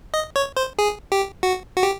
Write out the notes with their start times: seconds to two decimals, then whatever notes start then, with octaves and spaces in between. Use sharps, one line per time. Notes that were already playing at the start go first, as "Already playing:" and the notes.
0.14 D#5
0.36 C#5
0.57 C5
0.79 G#4
1.12 G4
1.43 F#4
1.76 F#4
1.83 G4